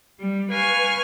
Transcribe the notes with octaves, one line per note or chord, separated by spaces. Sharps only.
G3
B4 F5 G#5 C#6 F6